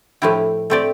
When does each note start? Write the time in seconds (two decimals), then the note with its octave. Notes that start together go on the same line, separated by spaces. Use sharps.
0.22 A2 F3 A3 E4 G4
0.70 A3 C4 G4 D5